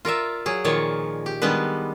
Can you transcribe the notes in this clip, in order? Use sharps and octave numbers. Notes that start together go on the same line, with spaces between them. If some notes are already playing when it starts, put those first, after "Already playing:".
F4 A#4 D5 E5
F#3 G#4
A#2 D#3 F3 C#5 D5
G4
D#3 G3 G#3 B3 D4 B4